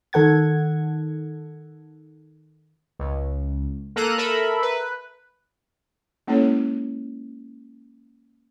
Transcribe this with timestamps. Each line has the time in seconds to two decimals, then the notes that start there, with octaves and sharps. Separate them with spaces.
0.13 D#3 A4 F#5 G#6
2.99 C#2
3.96 A#3 A4 A#5 F#6 D#7
4.18 A4 A#4 E5 B5
4.62 B4
6.28 G#3 A#3 C#4 E4 A4 C#5